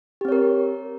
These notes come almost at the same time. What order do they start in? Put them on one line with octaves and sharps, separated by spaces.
G4 C4 C#5 A#4